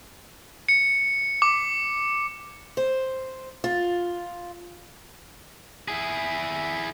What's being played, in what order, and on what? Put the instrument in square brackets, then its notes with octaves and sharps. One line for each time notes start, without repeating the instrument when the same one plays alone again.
[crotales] C#7
D6
[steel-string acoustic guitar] C5
F4
[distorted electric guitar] E4 G#4